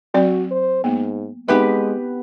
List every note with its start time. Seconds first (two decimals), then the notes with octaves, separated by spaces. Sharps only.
0.14 F#3 C4 F#4 D5
0.51 C5
0.84 G#2 A#3 B3
1.48 G#3 B3 C4 D#4 G4 B4 E5